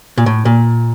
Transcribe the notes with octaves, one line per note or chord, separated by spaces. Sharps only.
A#2
A2
A#2